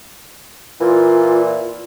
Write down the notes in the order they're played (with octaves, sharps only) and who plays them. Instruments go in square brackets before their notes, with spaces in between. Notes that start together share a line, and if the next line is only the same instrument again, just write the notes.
[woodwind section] A#2 E3 [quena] F4